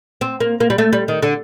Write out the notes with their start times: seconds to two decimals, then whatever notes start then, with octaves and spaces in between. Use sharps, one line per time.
0.21 C4
0.40 A#3
0.60 A#3
0.70 G3
0.78 A3
0.93 G3
1.08 D#3
1.22 D3